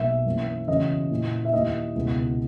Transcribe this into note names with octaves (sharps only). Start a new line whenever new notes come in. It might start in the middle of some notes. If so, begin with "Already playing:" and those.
Already playing: B1 B2 A#3 E5
F#2 E3 A#3
E2 C#3 F#3 C#4 D#5
A#2 A#3 E4
E5
D#2 D#3 A#3 E4 D#5
C#2 B2 G#3 B3 E4